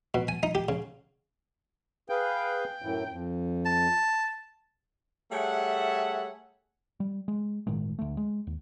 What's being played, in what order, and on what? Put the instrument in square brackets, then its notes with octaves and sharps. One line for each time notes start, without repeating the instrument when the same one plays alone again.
[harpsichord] B2
G#5
D#4
G4
C#3
[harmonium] G#4 B4 F5 [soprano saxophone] G5
[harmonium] F#2 A2 E3
F2
[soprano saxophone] A5
[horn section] G3 A3 G#4 C#5 E5 F#5
[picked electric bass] G3
G#3
G1 A2 D#3 G#3
D2 A3
G#3
D#2